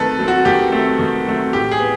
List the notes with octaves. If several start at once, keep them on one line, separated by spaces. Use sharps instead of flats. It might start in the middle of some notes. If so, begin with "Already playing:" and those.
Already playing: D#3 F#3 A3 C4 A4 B4
F#3 A3 C4
F#4
D#3 G4
F#3 A3 C4
D#3
F#3 A3 C4
A2 G4
G#4
B3